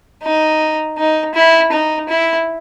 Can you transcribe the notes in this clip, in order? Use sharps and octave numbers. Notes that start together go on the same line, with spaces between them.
D#4
D#4
E4
D#4
E4